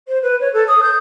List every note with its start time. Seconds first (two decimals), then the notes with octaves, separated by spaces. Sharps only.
0.08 C5
0.22 B4
0.40 C#5
0.53 A4
0.67 D#6
0.82 G6